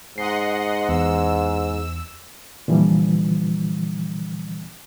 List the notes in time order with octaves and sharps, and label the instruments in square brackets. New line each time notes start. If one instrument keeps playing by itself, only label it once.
[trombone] G#2 [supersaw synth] D#5 F#5 C6 [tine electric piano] C7
[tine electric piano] E2 [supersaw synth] E6
[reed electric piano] A#2 D3 E3 F3 G3